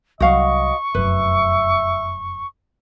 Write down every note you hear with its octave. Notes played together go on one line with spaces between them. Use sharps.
C2 F#3 F#4 D#5 F5 F#5 C#6
F1 F#2 B4 E5